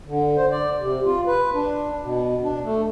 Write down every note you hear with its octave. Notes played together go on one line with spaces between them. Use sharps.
D3
C5
D5
C3
F4
B4
D4
B2
D4
A3